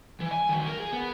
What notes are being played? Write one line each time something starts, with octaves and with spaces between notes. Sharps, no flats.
E3
G#5
D#3 F#3
A#4
G#4
B3